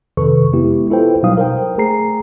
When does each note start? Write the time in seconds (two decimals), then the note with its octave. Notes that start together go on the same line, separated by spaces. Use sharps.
0.17 F2 C3 D#3 A4 B4 C#6
0.53 G#3 B3 E4 G4
0.90 E4 F4 A4 B4 C5 G5
1.23 B2 F#3 G3 D#4 F5 D#6
1.37 A#4 C5 G5
1.78 A3 G#4 A#5 C7